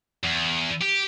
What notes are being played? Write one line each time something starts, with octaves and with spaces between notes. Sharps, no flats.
E2
G4